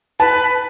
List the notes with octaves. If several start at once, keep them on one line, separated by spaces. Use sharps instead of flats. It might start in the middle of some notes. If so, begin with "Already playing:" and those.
B4 A5